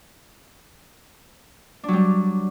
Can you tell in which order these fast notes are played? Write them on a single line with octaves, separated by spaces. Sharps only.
D4 F#3 G3